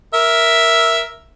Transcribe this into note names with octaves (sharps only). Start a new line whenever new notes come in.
A#4 E5